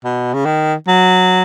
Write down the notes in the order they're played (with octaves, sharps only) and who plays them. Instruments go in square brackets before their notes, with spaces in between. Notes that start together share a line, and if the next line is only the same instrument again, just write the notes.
[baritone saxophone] B2
C#3
D#3
F#3